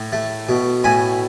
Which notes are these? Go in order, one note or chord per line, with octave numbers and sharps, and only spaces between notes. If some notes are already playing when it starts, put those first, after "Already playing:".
Already playing: A2
A3
B2
A2 G#5 B5